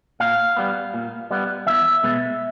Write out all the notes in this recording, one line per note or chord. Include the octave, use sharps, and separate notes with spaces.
A#2 F5
G3 B3
A#2
G3 B3
E2 E5
B2 G#3 B3